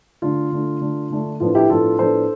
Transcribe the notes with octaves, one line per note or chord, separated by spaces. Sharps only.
D3 A3 D4 F4
D3 A3 D4
D3 A3 D4
D3 A3 D4
A2 F3 B3 D4 F4
E4 G4
A2 F3 B3 D4 F4 A4
A2 F3 B3 D4 A4 C5